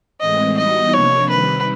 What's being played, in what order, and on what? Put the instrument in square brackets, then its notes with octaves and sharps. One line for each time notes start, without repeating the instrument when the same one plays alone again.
[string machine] A2 E3 G#3 C4 [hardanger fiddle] D#5
[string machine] E3 G3 B3 D#4 F#4 [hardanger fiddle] D#5
[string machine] C3 F3 A#3 D4 [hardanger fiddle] C#5
[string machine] C3 D#3 G3 C4 [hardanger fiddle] B4